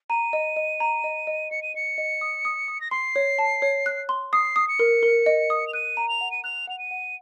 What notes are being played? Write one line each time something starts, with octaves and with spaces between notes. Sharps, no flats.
A#5 D#7
D#5
D#5
A#5
D#5
D#5
D#5 C#7
D#7
D#5 C#7
D#5
D#6
D#6
D#6
A#6
C6 C7
C#5
A5
C#5
F#6
C6
D#6 C7
D#6
C#7
A#4
A#4
D#5
D#6
F7
F#6 D#7
A#5
F7
F#5
D#7
F#6 F7
F#5 F7
D#7
F#5